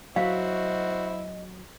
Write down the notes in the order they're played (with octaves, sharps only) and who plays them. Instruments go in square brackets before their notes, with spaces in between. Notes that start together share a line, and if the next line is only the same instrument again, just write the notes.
[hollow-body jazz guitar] F#3 [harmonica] E4 F#4 C5 [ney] D#5 [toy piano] F5